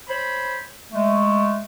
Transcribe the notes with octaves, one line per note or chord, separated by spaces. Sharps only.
C5 C#5 B5
G#3 A3